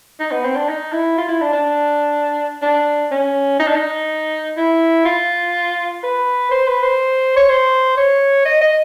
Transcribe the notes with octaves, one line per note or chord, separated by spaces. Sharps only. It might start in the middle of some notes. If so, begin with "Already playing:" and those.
D#4
B3
C4
D4
D#4
E4
F4
E4
D4
D4
D4
C#4
D#4
D4
D#4
E4
F4
B4
C5
B4
C5
C#5
C5
C#5
D#5
D#5